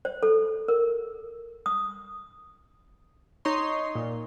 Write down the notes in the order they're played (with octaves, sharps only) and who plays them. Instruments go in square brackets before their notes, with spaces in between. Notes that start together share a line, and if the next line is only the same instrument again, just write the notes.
[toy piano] C5
A4
A#4
D#6
[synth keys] D#4 C#5 C6
A#2